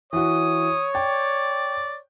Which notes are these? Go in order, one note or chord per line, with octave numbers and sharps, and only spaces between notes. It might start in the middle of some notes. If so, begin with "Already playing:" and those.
E3 F#4 C#5 D#6
D5 G5